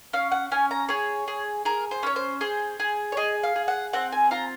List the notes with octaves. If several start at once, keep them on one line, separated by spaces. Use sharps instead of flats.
C#4 F5
F#5
C#4 G#5
A#5
G#4 C#5
G#4
G#4 A#4
C5
C#4 C#5
C5
G#4 C5
G#4
C#5
G#4 D#5
F5
G#4
F#5
C4 F#5
G#5
F4 A#5